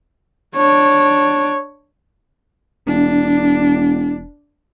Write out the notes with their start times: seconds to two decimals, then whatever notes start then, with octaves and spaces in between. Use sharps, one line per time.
0.56 D4 C#5
2.87 E1 D4